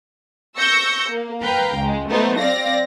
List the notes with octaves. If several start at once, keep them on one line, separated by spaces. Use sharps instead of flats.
C#6 E6 G6 A#6 C#7
A#3
B4 F5 G5 A#5
C#2 G#3
F#3 A3 B3 D#4 C5
C4 D5 F5 A#6